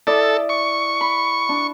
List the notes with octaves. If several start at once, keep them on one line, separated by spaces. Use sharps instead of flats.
E4 A4 D5 D#6
C#6
B5
D4